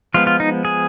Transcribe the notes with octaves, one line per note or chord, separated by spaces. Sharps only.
F3 G#3 B3 F4
F4
D#4
G#4